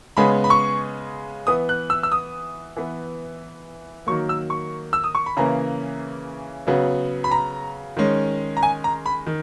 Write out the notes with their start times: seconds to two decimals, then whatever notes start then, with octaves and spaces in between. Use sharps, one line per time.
0.17 C#3 G#3 B3 B5
0.44 B5
0.50 C#6
1.47 E3 B3 D#6
1.69 F#6
1.90 E6
2.03 E6
2.12 D#6
2.77 E3 B3
4.07 D#3 F#3 A#3 C#6
4.29 E6
4.50 C#6
4.93 E6
5.04 D#6
5.15 C#6
5.26 B5
5.37 C#3 E3 A#3 C#4 A#5
6.67 C#3 F#3 B3
7.24 B5
7.31 A#5
7.97 D#3 G#3 C#4
8.57 A#5
8.63 G#5
8.84 A#5
9.06 B5
9.26 D#3